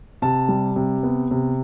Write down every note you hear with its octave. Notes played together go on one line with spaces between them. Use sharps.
C3 A5
G3
C3
B3
C3